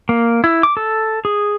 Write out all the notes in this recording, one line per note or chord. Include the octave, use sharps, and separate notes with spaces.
A#3
E4
D6
A4
G#4